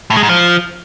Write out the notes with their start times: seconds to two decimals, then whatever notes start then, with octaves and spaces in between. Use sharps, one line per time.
0.10 A2
0.17 G#3
0.23 G#2
0.29 F3